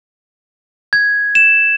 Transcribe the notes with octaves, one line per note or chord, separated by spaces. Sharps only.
G#6
E7